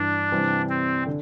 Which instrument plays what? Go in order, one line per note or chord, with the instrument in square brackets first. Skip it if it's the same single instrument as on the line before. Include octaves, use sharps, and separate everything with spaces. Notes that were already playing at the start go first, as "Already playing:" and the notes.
Already playing: [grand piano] G2 E3 [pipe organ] D4
[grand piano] C3 E3 G3 C4
[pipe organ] C4
[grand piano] D3